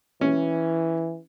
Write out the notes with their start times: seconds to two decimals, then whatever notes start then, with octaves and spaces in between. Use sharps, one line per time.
0.21 E3 C#4